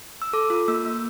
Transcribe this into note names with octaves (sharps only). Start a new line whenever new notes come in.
E6
A4 D6
F4
A#3 E6
A#3